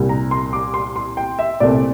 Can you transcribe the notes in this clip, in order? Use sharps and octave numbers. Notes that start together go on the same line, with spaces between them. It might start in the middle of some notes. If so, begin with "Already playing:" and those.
Already playing: C2 A#2 G3
A#5
C6
D6
C6
C6
G5
E5
C2 A#2 A3 C4 D5